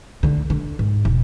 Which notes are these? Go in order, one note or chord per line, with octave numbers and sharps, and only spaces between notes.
D3 A3
D3
G#2
E1